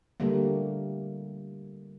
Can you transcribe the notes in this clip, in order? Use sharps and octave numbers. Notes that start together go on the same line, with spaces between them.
D3 G3 A3 A#3